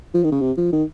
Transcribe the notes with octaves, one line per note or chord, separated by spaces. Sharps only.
F3
D#3
C#3
C3
F3
D#3